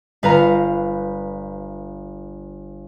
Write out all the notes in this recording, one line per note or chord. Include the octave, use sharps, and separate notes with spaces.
G1 B4 F5 A#5